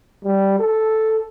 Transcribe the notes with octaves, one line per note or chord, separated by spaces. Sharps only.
G3
A4